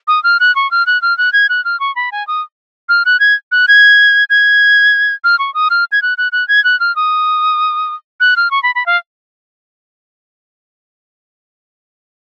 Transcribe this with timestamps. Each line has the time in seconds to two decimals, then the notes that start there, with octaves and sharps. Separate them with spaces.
0.08 D#6
0.24 F6
0.40 F#6
0.56 C#6
0.71 F6
0.86 F#6
1.02 F6
1.18 F#6
1.33 G#6
1.49 F#6
1.65 F6
1.80 C#6
1.96 B5
2.12 G#5
2.27 D#6
2.89 F6
3.05 F#6
3.20 G#6
3.52 F#6
3.68 G#6
4.30 G#6
5.24 F6
5.39 C#6
5.54 D#6
5.70 F6
5.92 G#6
6.02 F#6
6.18 F#6
6.32 F#6
6.48 G#6
6.64 F#6
6.80 F6
6.96 D#6
8.20 F#6
8.36 F6
8.51 C#6
8.63 B5
8.75 B5
8.86 F5